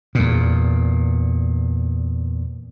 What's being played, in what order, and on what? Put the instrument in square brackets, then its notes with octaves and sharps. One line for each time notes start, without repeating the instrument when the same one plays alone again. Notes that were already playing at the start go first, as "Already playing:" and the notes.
[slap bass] E2 A#2